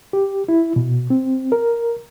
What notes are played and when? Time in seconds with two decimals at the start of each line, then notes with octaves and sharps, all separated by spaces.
0.13 G4
0.48 E4
0.76 B2
1.10 C4
1.52 A#4